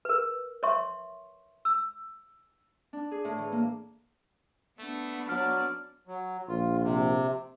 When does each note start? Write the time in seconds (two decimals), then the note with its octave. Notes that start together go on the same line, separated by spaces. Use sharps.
0.05 A#4 B4
0.63 C#5 E5 C6 C#6
1.65 E6
2.93 D4
3.11 G#4
3.25 A2
3.38 E3
3.52 A#3
4.79 A3 B3 D4
5.29 F#3 D5 F6
6.07 F#3
6.48 A#1 F4
6.83 C3